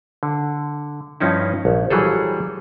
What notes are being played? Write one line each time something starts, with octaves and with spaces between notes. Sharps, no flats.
D3
G2 F3 C#4 D#4 E4
A#1
E3 F#3 G3 G#4 A4